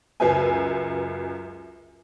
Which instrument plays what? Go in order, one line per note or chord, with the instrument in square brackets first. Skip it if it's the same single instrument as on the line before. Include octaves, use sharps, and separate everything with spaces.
[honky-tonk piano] C#2 F#2 A#4 B4 E5 G#5